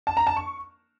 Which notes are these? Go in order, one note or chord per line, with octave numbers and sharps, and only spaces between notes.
A5
A#5
A5
C#6